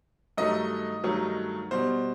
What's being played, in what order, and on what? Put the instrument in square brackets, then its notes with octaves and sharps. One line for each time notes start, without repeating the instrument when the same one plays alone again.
[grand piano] G2 D#3 F#3 A3 D#5
G2 D#3 F#3 A3
B2 G3 C5